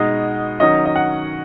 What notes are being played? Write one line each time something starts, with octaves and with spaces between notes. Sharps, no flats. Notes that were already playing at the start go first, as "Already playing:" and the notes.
Already playing: B2 G#3 D#4 D#5
D#3 F#3 C#4 D#5
D#5
F#5